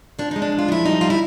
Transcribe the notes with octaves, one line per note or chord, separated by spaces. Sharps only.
F3 D4
G#3 D#4
D4
E2
F4
F3 E4
G3 D#4
G3 F4
E4